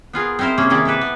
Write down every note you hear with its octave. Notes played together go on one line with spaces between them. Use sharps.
B3 F4 G#4 A#4
C4 D#4 E4 A#4 C5
C3 A#3 C#4 G#4
D#3 G#3 E4 G#4 D5
E4 G4 A4 B4
B3